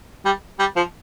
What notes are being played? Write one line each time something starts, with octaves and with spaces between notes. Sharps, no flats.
G3
G3
F3